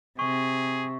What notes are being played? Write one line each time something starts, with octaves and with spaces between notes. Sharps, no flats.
C3 G#4 C#6